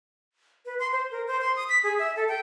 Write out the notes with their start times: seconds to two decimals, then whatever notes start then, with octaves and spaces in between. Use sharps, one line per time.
0.66 B4
0.79 C6
0.92 C5
1.11 A#4
1.27 C5
1.41 C6
1.56 D#6
1.69 B6
1.83 G#4
1.99 E5
2.16 A4
2.28 G5